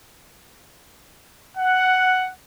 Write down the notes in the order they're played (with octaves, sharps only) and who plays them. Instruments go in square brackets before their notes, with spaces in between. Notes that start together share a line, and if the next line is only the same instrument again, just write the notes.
[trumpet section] F#5